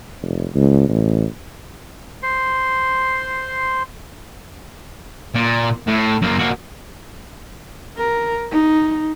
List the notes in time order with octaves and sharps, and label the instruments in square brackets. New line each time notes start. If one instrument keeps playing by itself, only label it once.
[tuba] F1
C#2
A1
[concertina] C5 C6
[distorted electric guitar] A#2
A2
F#2 A#3
A#3 F#4
[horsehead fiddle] A#4
D#4